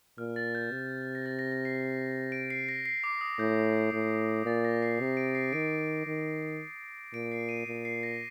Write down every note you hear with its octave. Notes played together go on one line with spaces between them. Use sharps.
A#2 F6
A6
G6
C3
A#6
A6
A#6
A#6
C7
D7
C7
A#6
C7
D6
D#6
A2 G6
A2
A#2 A6
A#6
C7
C3
D7
C7
D#3 D7
D#3
A#2 D7
C7
D#7
A#2 D7
C7
A#6